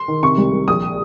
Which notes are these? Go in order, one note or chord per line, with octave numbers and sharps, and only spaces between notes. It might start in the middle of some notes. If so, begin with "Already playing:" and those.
Already playing: C6
D#3
C3 C#6
C2
C2
A#1 D#6